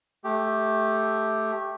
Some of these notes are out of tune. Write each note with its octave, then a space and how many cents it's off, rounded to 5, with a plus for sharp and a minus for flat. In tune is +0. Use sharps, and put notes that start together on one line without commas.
A3 -10 G4 +0